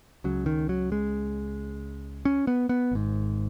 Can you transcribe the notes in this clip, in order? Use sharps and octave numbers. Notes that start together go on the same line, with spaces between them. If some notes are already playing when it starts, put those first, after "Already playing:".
C#2 C#3 F#3
D#3
F#3
G#3
C#4
B3
B3
G#1 G#2